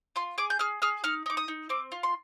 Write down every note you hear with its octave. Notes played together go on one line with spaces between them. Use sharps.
F4 C6
G#4 D6
G6
G#4 F6
G#4 F6
D#4 F6
D#4 D6
D#6
D#4
C4 D6
F4
C6